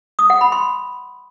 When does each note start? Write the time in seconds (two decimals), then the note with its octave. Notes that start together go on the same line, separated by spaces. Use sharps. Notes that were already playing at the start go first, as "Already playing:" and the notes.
0.19 D#6
0.30 F#5
0.41 B5
0.52 C6